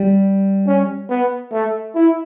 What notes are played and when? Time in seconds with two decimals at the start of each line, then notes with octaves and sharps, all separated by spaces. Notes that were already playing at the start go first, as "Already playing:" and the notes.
Already playing: G3
0.67 C#4
1.09 B3
1.52 A3
1.94 E4